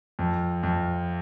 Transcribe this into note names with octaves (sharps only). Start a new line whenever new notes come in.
F2
F2